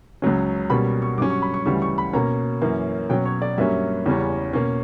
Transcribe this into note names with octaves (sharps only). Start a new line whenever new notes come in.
C#2 C#3 F#3 C#4
B2 G3 A#3 C#4 B5
C#6
G2 F#3 C#4 D6
C#6
B5
C#6
D2 C#3 E3 G3 C#6
C#6
B5
B2 A#3 C#4 A#5
F#2 E3 A#3 C#4
B2 F#3 C#4 G5
C#5
D5
G2 F#3 A#3 C#4 E5
E2 C#3 G3 C#4
B2 A#3 C#4